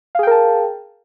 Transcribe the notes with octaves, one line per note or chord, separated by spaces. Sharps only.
G#4 A#4 F5 G5 A5